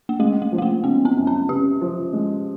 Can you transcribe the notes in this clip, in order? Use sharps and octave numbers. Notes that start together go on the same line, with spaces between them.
A#3
G#3 A3
A3
F3
A3
A#3
C#3 B3
C4
F#2
C#4
C#3 G4
F3
G#3